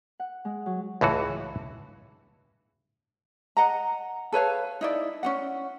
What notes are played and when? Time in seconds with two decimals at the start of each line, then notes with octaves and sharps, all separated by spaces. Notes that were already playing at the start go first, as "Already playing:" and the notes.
0.20 F#5
0.45 G#3
0.66 F#3
1.01 C#2 A2 E3 F#4
3.57 D#5 F#5 A#5
4.32 A4 B4 C#5 F5
4.81 D#4 E4 D5
5.23 C#4 D#4 F#5